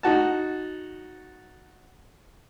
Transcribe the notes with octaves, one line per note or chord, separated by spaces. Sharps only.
D#4 F#4 A5